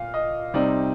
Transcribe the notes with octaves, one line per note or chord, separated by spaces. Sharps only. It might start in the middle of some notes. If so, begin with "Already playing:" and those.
Already playing: A#2 F5
D#5
C3 G3 C4 D#4 D5